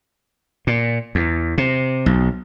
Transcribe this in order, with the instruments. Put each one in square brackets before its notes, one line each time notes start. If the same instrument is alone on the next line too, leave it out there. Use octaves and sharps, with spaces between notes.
[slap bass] A#2
E2
C3
B1